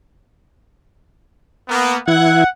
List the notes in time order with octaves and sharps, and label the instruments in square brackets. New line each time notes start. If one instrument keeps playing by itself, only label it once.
[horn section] A#3 B3
[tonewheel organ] E3 E4 G#6 [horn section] F#5